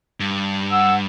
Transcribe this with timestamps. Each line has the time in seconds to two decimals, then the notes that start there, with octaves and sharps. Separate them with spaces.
0.20 G2
0.72 F#5 E6